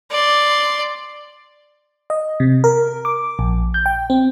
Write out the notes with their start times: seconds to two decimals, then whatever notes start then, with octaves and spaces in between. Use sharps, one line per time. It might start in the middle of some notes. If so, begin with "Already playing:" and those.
0.11 D5 C6
2.10 D#5
2.40 C3
2.64 A#4
3.05 D6
3.39 A#1
3.74 G6
3.86 G5
4.10 C4